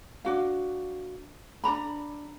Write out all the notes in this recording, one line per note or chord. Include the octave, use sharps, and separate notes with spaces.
D4 F#4 F5
D4 A#4 A#5 B5